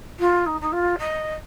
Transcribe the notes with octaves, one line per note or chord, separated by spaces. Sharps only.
F4
D#4
D#4
F4
D#5